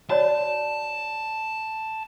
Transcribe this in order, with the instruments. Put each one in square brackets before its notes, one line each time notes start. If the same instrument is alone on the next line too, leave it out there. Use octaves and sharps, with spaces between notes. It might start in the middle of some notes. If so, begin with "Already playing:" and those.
[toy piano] F#4 C#5 D5 [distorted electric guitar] A5